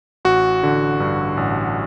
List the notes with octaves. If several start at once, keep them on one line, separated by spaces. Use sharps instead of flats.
A1 F#4
D3
G2
A1